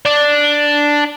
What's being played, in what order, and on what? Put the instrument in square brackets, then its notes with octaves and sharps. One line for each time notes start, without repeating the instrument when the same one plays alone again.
[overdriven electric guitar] D4